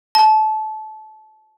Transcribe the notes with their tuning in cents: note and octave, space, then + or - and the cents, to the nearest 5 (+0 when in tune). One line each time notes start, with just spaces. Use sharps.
A5 -25